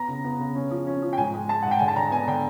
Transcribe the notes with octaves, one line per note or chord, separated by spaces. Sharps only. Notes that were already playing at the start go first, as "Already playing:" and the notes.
Already playing: B3 A#5
C#3
B3
C#3
C#4
F3
C#4
F3
G5
G#2 G#5
G#3
G#3 A5
G#2 F#5
G5
D3 G#5
A5
D3 A#5
B3 G#5
D3 G5